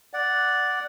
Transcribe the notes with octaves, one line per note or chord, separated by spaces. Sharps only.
D5 F#5